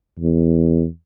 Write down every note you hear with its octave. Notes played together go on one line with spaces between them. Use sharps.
E2